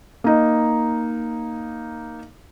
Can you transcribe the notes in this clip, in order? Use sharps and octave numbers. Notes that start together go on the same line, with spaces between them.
A#3 D#4